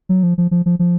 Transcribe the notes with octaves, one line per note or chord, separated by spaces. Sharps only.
F#3
F3
F3
F3
F3
F3